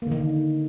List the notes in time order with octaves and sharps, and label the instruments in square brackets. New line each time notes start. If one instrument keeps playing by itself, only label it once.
[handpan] A#3
D3
D#3